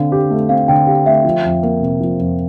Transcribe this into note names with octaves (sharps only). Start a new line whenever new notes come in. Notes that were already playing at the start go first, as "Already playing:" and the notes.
Already playing: D3 C4 F5
G4
A3
C4 F5
D3 G5
G4 F5
A3 E5
F3
F2
A#3
C3
F3
F2